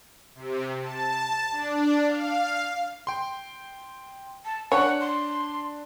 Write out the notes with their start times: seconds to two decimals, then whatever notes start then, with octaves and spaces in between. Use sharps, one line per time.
0.35 C3
0.81 A5
1.52 D4
2.04 F5
3.07 G5 C6
4.45 A5
4.72 D4 C#5 F#5
5.00 C6